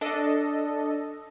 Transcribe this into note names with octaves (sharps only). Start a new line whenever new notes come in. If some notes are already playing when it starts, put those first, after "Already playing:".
D4 A4 D#5